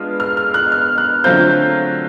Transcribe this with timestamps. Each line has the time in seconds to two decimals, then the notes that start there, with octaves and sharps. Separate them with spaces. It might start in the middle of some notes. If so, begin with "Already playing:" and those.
Already playing: G#3 B3 D4 F4 F6
0.20 F6
0.37 F6
0.54 F#6
0.72 F6
0.98 F#6
1.24 D3 F#3 A3 C4 F4 G6